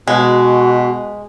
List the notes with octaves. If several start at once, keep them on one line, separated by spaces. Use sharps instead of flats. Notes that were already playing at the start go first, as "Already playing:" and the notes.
B2 G#3 F#4